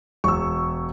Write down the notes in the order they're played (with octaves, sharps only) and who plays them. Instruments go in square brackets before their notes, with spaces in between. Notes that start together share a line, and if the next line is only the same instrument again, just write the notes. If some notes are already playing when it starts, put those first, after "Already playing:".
[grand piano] E1 [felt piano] C#6 E6